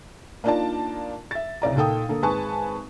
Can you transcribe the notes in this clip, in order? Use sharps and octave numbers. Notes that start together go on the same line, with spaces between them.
A#3 D4 D#4 F4 D5 A5
E5 A6
C2 C#3 D5 A#5
A#2 D#4 A4 G5 D#6
D3 A#3 A4
G#1 G#3 B4 G#5 A5 C#6